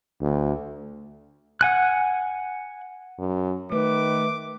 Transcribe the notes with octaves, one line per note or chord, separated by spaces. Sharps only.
D2
F#5 G#5 F#6
F#2
D#3 A3 B4 D6